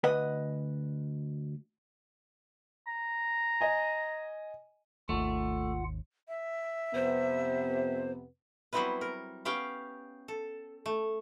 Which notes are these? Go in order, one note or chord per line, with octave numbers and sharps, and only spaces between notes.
D2 B4 D#5 F#5
A#5
D#5 G#5
G#1 D#2 A3 F4 F#5
E5
F2 C3 B3 C5
F#3 G3 B3 C4 E4 B4
A#4
B3 C#4 G4 F5 G5
A4
A3